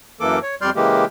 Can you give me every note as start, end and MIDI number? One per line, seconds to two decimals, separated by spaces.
0.21 0.39 42
0.21 0.39 52
0.21 0.39 58
0.21 0.39 69
0.21 0.39 86
0.43 0.55 73
0.62 0.70 41
0.62 0.70 55
0.62 0.70 74
0.62 0.70 84
0.62 0.70 89
0.62 0.70 91
0.76 1.05 49
0.76 1.05 52
0.76 1.05 56
0.76 1.05 58
0.76 1.05 67